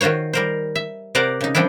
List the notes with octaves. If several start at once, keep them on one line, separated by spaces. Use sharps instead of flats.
D#3 F4 F#4 C5 C#5
G3 A#4 C5
E5
C3 A#4 C5 D5 F#5 A#5
C#3 D#4
F3 G3 C4 D4 E4